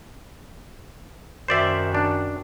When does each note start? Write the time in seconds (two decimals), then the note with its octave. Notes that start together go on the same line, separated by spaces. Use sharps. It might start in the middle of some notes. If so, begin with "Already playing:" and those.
1.48 F#2 D#3 F#4 C5 D5 E5
1.95 D4